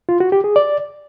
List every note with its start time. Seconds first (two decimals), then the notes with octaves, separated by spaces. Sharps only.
0.09 F4
0.20 F#4
0.32 G4
0.44 G#4
0.56 D5